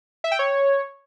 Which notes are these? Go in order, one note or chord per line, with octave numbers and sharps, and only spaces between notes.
E5
G5
C#5